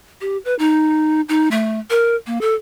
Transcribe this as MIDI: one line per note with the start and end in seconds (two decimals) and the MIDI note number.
0.21 0.37 67
0.45 0.55 71
0.59 1.21 63
1.29 1.49 63
1.51 1.79 57
1.90 2.15 70
2.27 2.41 58
2.41 2.54 69